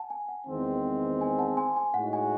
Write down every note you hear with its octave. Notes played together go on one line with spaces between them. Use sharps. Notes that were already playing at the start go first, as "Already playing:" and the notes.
Already playing: F#5 G#5 A5
G#5
F#5
E2 D#3 G#3 C4
G#5
F#5 A5
G#5 C6
G#5
A2 G#3 D#4 F#4 F#5
G#5